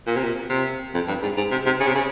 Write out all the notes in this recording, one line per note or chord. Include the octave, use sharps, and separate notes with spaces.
A#2
C3
A#2
C3
F2
G2
G#2
G#2
C3
C3
C#3
C3
C#3